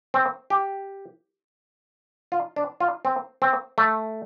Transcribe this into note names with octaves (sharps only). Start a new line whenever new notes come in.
C4
G4
F4
D4
F4
C4
C4
A3